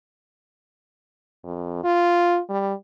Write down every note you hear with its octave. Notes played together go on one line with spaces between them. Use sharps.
F2
F4
G3